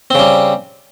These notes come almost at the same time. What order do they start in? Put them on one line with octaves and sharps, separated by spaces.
C4 C#3 G3